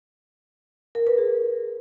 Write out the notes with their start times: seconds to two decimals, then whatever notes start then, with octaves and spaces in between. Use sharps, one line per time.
0.95 A#4
1.07 B4
1.18 G#4